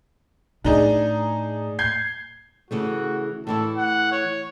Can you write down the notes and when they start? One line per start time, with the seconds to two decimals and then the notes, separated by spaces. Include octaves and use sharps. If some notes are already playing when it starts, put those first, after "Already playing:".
0.64 A2 D4 D#4 G#4
1.79 G6 G#6 C7
2.71 C#3 E3 A3 F#4
3.47 A2 E3 E4 A4
3.77 F#5
4.12 C#5